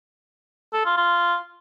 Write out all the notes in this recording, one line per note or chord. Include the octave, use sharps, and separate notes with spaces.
A4
F4
F4